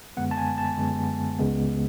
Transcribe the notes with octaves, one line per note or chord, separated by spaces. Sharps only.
F#2 D3 G#3 B3 F#5
A5
G#5
A5
F#2 D3 G#3 B3
C#2 C#3 G#3 B3